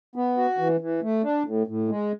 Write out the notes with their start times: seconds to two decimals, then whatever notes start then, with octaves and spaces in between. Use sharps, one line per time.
0.16 B3
0.37 F#4
0.58 E3
0.81 E3
1.02 A3
1.23 D4
1.46 A2
1.67 A2
1.89 G#3